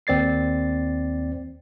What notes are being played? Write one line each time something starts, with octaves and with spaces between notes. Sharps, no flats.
D#2 C4 D5 A6 C7